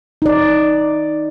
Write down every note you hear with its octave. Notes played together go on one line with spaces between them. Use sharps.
D#4 D5